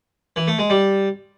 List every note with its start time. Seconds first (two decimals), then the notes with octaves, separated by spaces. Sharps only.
0.36 E3
0.47 A3
0.59 G#3
0.70 G3